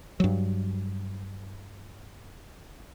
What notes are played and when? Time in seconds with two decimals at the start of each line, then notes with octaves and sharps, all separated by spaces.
0.20 G2 F#3